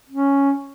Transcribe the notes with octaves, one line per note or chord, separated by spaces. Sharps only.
C#4